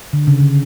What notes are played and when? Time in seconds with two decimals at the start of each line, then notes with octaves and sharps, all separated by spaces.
0.13 D3
0.27 C#3
0.40 D3